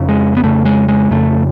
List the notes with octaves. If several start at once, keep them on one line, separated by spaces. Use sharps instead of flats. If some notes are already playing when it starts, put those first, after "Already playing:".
Already playing: F2 C#3
G#3
B3
F2 C#3 A3
G#3
G#3
F2 C#3 A3